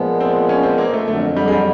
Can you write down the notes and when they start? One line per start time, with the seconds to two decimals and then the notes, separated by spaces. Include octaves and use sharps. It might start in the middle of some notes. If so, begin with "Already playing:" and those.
Already playing: A#2 F3 G#3 B3
0.20 C4
0.49 C#4
0.63 C4
0.78 A#3
0.93 A3
1.08 F2 D3 F#3 A3
1.36 G3
1.48 G#3
1.52 G3